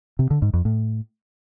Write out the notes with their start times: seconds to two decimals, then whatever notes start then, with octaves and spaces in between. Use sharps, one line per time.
0.19 C3
0.31 D3
0.42 G#2
0.54 F2
0.65 A2